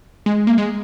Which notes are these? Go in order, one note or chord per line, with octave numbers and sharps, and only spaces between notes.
G#3
A#3
G#3